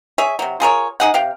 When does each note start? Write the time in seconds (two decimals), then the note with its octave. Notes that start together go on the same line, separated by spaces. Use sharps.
0.18 G#4 C#5 E5
0.39 C3 F#3
0.60 F4 G#4 A#4 C#5
1.00 D#4 G#4 F#5
1.14 C3 F5 G5